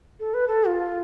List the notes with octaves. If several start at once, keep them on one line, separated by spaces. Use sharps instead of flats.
A4
B4
A4
F4